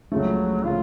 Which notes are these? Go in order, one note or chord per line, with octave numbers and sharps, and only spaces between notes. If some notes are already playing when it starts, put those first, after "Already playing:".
C#2 C#3 F3 F#3 A3
C#3 F3 A3 F4